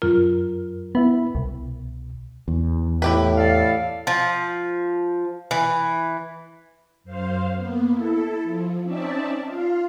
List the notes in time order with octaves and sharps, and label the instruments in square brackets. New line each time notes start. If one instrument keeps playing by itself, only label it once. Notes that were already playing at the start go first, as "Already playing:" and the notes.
[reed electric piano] F#2 A#4 [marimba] F4
[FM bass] B3 [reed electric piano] E4 E5 B5
[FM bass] C2 [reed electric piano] B2
[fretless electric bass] E2
[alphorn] A2 [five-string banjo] E4 G4 B4
[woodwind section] A4 D5 F5
[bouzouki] F3
E3
[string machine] F#2 C5 F5
A#3 B3
E4 A4
F3
C4 C#4 D#4 D5 E5 A5
F4 F5